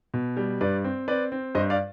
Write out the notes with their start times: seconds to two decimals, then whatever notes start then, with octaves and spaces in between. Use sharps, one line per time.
0.14 B2
0.37 G3
0.61 G2 B4 D5
0.84 C4
1.08 C4 B4 D5
1.32 C4
1.55 G2 C5 D#5
1.70 D5 F5